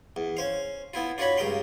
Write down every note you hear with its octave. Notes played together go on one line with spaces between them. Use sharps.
E2
C#4 C5 F5
B3 E4 F4
D4 F4 F#4 C#5 B5
C#2 G2 A#4 F5 G5 C6